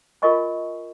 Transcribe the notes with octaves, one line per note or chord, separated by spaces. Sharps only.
F4 A#4 D#5 G#5 C#6